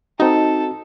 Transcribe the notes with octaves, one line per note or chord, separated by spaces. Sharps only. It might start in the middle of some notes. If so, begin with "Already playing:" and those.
C4 D#4 F#4 A4